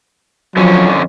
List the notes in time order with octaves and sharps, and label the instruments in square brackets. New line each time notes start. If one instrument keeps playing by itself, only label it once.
[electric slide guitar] F2 D3 C#4 [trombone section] F3 F#3